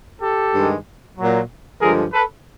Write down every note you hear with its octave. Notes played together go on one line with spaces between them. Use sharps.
G4 A4
G2 D#3 G#3
A#2 F#3
G2 D3 F3 G#3 G#4 A#4
A4 B4